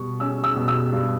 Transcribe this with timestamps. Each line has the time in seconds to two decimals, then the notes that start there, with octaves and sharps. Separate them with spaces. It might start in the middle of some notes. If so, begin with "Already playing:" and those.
Already playing: B2 G3 C#6
0.20 C#4 E6
0.44 E6
0.56 B2
0.68 E6
0.92 G2